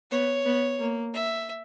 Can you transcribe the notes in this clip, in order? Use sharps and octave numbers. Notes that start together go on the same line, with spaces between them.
B3 C#5
B3
A#3
E5